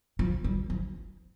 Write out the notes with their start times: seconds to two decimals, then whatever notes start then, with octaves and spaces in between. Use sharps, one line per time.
0.19 F3
0.44 G3
0.70 F3